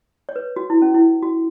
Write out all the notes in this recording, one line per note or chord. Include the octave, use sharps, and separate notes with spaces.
C#5
B4
F#4
E4
C#4
E4
F#4